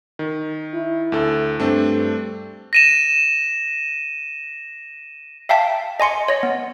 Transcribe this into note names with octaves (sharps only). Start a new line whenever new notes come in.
D#3
E4
D2 A4
G2 A3 C4 D4
A#6 D#7 E7
E5 F5 G5 A5 B6
D#5 G#5 C6 C#7
C#5 D#5
B3